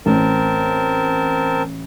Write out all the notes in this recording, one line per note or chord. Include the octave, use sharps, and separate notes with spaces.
A1 C4 A#4 A5